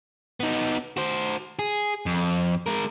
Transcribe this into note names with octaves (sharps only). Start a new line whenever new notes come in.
B3 D#4
F#4 C5
G#4
F2
G#3 A#4